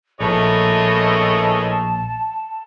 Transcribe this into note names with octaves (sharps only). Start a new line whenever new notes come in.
A#1 E3 A3 G#4 A#4 C#5 D#5 A5